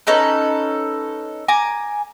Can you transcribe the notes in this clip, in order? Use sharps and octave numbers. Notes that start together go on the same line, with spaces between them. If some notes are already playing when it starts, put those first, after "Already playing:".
C#4 D#4 A4 B4
G#5 A#5 D6